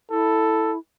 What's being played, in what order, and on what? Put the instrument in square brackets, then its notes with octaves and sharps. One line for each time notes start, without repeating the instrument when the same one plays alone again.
[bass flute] E4 [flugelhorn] A4